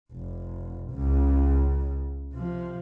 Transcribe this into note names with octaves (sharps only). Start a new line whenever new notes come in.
F1
C#2 C#3
C3 F3